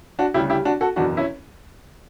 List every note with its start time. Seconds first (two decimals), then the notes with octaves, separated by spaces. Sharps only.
0.19 D4 F#4
0.34 D2 C#3 G3 E4 G4
0.50 E4 G4
0.65 D4 F#4
0.81 F#4 A4
0.96 F#1 E2 B2 D4 F#4
1.17 C#4 E4